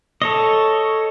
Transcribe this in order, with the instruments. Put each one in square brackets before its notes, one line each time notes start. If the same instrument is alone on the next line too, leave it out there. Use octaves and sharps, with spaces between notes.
[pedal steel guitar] A4 C#5 D#5